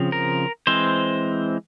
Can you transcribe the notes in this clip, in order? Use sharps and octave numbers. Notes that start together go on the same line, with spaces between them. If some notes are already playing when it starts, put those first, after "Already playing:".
Already playing: C#3 F3 C4
A#4
E3 G#3 C4 C5